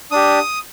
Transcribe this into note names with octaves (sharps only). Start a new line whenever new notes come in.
D4 G4 D#6